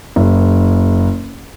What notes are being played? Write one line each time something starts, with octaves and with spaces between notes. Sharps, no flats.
F#1